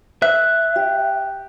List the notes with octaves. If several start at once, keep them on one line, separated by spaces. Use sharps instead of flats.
E5 F#6
G4